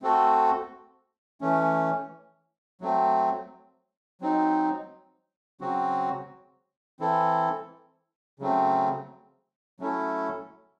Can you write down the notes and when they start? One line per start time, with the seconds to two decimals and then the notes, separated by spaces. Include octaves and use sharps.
0.02 A3 C4 F#4 A4
1.41 E3 A3 C#4
2.81 F#3 A3 C4
4.21 F#3 C4 D#4
5.61 C#3 F#3 C4 F#4
7.00 E3 C4 E4 A4
8.39 C#3 F#3 A3 C4
9.80 F#3 A3 C#4 E4 A4